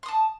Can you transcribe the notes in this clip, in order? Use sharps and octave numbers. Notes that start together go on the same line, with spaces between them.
A5 C6 D#6